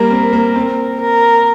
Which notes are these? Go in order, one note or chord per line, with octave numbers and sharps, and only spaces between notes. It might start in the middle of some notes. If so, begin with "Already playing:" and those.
Already playing: G3 A#3 A#4
C4
A#3
C4
A#4